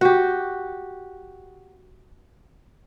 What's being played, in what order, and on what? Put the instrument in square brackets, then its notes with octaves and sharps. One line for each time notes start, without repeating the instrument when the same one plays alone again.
[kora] F#4 G4